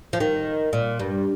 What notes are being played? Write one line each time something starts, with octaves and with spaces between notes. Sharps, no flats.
F3
D#3
A#2
G2